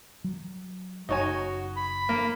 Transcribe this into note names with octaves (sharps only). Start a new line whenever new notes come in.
F#3
F#1 D#4 F#4 C#5 G#5
B5
A#3